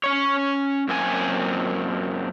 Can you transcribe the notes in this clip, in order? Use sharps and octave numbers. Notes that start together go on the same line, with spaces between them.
C#4 C#5
F#2 A#3 C4 D4 G#5